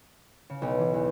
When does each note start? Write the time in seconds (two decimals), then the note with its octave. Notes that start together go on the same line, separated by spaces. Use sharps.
0.50 C#3
0.62 B1
0.78 E3
0.94 E2